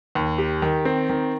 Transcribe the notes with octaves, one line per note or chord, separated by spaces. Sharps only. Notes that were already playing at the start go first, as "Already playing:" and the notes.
D#2
G4
D#3
C4
D#3